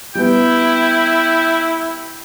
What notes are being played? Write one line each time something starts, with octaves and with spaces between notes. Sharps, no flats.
G3 B3 E4 G5